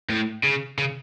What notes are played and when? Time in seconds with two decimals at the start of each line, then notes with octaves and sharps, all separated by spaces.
0.10 A2
0.44 C#3
0.79 C#3